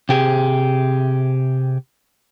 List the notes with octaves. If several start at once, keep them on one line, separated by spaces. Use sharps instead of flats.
C3 G4 G#4